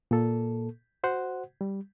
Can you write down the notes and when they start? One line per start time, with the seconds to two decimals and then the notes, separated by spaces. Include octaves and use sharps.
0.11 A#2 A#3 A4
1.04 F#4 C5 F#5
1.61 G3